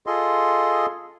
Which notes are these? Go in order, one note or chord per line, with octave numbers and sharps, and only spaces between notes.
F4 G#4 A4 D#5 C6